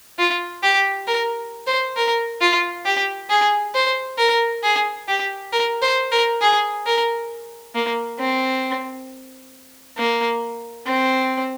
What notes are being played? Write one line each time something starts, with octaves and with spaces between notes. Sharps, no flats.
F4
G4
A#4
C5
A#4
F4
G4
G#4
C5
A#4
G#4
G4
A#4
C5
A#4
G#4
A#4
A#3
C4
A#3
C4